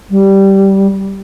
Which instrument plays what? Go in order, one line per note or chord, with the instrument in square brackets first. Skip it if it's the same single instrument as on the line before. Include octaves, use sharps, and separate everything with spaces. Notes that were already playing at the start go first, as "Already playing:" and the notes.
[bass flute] G3